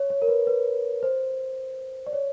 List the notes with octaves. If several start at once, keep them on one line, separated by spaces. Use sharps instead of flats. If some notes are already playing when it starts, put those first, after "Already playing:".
Already playing: C#5
C#5
A#4
B4
B4
C5
D5
C#5